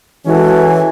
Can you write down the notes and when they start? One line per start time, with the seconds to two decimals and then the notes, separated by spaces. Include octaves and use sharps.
0.25 E3 G#3 C#4 F#4 A4